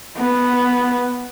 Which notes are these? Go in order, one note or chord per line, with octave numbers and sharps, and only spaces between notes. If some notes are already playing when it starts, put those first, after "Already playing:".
B3